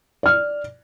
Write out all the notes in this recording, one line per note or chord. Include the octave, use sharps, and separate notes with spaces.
D5 F6